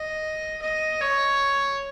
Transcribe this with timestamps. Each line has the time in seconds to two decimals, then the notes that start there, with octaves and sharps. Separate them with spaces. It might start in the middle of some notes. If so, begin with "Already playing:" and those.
Already playing: D#5
0.62 D#5
1.01 C#5